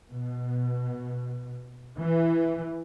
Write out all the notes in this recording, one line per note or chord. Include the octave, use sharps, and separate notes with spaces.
B2
E3